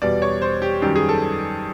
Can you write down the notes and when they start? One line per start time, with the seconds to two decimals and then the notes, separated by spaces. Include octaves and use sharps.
0.02 E2 B2 G3 D5
0.22 C#5
0.42 C5
0.62 G4
0.82 F#2 D#3 G3 G4
0.96 G#4
1.09 A4